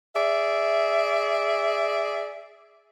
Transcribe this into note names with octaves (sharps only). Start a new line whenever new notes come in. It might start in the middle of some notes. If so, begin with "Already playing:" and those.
G#4 D5 E5